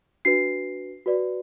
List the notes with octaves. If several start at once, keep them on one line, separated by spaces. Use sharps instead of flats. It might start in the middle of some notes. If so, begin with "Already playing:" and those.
D4 F#4 B4 C7
F#4 B4 D5